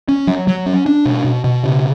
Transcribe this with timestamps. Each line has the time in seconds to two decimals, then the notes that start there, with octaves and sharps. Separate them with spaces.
0.09 C#4
0.27 F#3
0.47 F#3
0.66 C#4
0.86 D4
1.05 B2
1.25 B2
1.44 B2
1.64 C#3